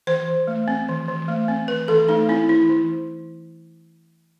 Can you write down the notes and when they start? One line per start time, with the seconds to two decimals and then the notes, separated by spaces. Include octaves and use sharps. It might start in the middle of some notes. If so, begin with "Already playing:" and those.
0.07 E3 C5
0.28 E3
0.47 A3
0.68 C4
0.88 E3
1.08 E3
1.28 A3
1.48 C4
1.68 E3 B4
1.88 E3 A4
2.08 A3 D#4
2.29 C4 E4
2.49 E3 E4
2.69 E3